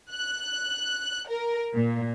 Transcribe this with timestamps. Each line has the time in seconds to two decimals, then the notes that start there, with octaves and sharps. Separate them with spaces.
0.13 F#6
1.30 A#4
1.74 A#2